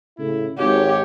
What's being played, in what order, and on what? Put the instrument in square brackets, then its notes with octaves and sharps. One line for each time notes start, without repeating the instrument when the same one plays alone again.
[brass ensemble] A2 C#3 E4
[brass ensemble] G#1 C#5 [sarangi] G4